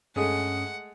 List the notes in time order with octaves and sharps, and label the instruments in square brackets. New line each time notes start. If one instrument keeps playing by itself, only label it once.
[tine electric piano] G2 C#4 D#6 [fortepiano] G#3 A3 G#4 [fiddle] F#5